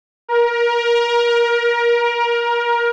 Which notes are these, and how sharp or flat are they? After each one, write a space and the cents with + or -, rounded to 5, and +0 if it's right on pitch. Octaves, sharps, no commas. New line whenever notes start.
A#4 +25